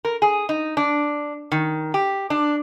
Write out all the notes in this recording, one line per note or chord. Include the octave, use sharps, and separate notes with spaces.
A#4
G#4
D#4
D4
D#3
G4
D4